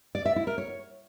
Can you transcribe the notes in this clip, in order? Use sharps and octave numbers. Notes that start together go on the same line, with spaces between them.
D5
E5
E4
A#4
C#5